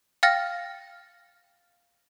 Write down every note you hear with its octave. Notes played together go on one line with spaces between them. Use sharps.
F5 G5 F6 A6 A#6